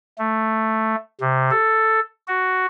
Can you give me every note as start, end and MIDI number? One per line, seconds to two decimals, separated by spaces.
0.18 0.95 57
1.20 1.50 48
1.51 2.00 69
2.27 2.66 66